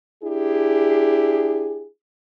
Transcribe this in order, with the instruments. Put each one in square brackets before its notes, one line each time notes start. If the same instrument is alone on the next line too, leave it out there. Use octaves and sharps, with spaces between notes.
[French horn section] D4 E4 G4 G#4